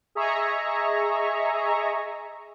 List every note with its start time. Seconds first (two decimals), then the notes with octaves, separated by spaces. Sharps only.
0.15 G#4 D#5 E5 G#5 A#5 C#6